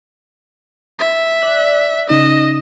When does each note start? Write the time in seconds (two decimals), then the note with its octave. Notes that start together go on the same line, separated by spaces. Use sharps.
0.99 E5
1.41 D5 F#6 B6
2.09 C#3 D#4 D#5 E7